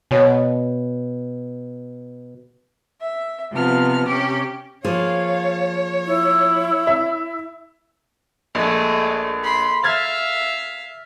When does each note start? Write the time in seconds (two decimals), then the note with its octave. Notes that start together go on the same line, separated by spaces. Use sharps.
0.11 B2 C#5 G#5
3.01 E5
3.52 C3 F3 B3 F6
4.08 C3 C#4 G4 D6
4.85 F3 A#3 G#4 C#5 F5
6.06 E4
6.87 E5
8.55 A#1 G#3 A3
9.44 B5 C6
9.84 E5 F5 F6 G#6 A6